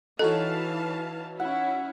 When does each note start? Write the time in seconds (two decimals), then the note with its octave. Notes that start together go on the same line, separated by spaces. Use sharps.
0.19 E3 D#4 F#4 A4 C#5 F5 A5
1.40 C#4 E4 F#5